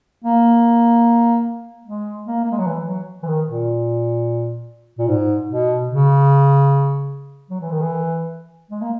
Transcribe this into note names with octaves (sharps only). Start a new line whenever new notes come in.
A#3
G#3
A#3
A#3
G#3
F#3
E3
F#3
E3
D#3
A#2
A#2
G#2
B2
C#3
F#3
E3
D#3
E3
G#3
A#3